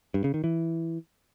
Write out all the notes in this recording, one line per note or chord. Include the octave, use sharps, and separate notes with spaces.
G2
C#3
D#3
E3